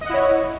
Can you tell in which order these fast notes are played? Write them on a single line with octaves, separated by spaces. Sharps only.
D#5 F#5 E4 C#5